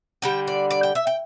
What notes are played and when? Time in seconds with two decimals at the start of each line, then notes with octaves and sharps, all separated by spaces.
0.22 D3 G3 G5
0.47 D5
0.70 D5
0.83 G5
0.95 E5
1.07 G5